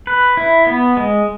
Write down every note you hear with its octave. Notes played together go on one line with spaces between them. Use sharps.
B4
E4
B3
G#3